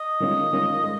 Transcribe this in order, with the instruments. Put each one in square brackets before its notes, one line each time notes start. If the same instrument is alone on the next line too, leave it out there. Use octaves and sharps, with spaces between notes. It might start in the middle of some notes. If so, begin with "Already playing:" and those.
Already playing: [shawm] D#5
[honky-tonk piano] D#3 G#3 C#4 F4
D#3 G#3 C#4 F4
G#3